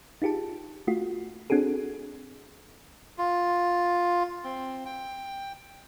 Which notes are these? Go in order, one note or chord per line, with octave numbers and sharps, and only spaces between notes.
D#4 F4 G4 G#4 A5
A3 F4 F#4
C4 D4 F#4 G#4 A4
F4
C4
G5